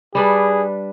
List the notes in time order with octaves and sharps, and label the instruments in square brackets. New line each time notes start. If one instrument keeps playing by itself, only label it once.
[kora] G3 D4 B4 [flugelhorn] G#4